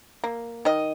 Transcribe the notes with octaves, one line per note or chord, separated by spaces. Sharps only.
A#3
D#3 D#5